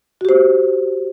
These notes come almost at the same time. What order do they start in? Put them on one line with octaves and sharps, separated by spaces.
F#4 G4 C5